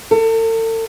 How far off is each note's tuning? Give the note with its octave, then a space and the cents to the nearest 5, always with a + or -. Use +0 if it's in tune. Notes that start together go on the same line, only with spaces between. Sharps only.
A4 +40